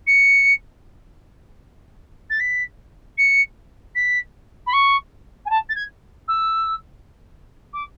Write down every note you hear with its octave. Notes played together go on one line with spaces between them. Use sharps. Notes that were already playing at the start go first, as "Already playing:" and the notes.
C#7
A6
B6
C#7
B6
B5
C#6
G#5
A5
A6
G#6
E6
D6